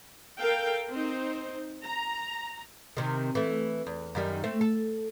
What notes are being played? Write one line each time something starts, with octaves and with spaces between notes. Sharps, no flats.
A4 A#4 F5 G5
C4 D#4 C5
A#5
C3 D#3
E3 A3
E2
F#2 D#3 G3
A3 C4
A4